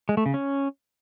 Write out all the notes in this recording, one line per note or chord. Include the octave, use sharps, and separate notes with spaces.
G#3
A3
C#3
C#4